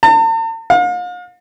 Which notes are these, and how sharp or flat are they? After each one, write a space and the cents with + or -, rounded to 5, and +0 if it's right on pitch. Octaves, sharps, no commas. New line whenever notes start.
A5 +45
F5 +40